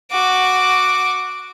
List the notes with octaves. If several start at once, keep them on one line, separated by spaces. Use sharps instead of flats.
F#4 D6